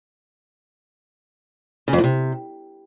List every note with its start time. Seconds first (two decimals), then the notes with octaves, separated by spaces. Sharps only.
1.88 C#3
1.93 F2
1.98 A2
2.04 C3